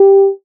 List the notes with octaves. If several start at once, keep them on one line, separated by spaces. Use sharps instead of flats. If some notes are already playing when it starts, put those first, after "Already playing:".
Already playing: G4